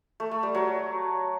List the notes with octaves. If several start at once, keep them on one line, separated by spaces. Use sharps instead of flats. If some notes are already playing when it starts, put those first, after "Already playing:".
A3
A3
G3
F#3